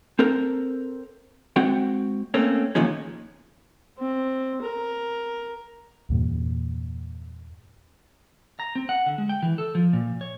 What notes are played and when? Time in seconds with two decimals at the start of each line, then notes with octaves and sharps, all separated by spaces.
0.19 C4 A4 A#4 C5
1.56 G#3 C4 F#4 F#5 G5
2.34 A3 A#3 C4 C#4
2.75 E2 A#2 D#3 F3 G#3 C#4
3.99 C4
4.62 A#4
6.10 E2 G2 A#2 G3
8.60 A#5
8.75 C4
8.89 F#5
9.06 D3
9.18 G#3
9.29 G5
9.42 E3
9.58 A4
9.75 F3
9.93 A#2
10.21 C#5